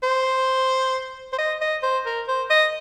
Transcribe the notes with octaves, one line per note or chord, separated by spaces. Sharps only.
C5
C5
D#5
D#5
C5
A#4
C5
D#5